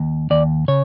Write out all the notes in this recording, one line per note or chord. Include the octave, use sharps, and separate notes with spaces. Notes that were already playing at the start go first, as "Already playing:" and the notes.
Already playing: D#2
D#2 D5
C#3 C#5